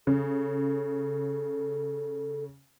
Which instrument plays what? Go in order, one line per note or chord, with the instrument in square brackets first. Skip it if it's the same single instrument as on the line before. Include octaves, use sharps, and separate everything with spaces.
[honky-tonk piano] C#3 [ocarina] A4